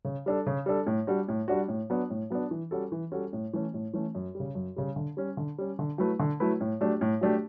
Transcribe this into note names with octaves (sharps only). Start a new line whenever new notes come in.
C#3
G3 D4 A4
C#3
G3 D4 A4
A2
G3 D4 F#4
A2
G3 D4 F#4
A2
F#3 B3 D4
A2
F#3 B3 D4
E3
G3 C#4 F#4 A4
E3
G3 C#4 F#4 A4
A2
E3 A3 C#4
A2
E3 A3 C#4
F#2
G3
C#3
F#2
C#3 G3
D3
G3 C#4
D3
G3 C#4
D3
F#3 A3 E4 B4
D3
F#3 A3 E4 B4
A2
F#3 A3 D4 G4
A2
F#3 A3 D4 G4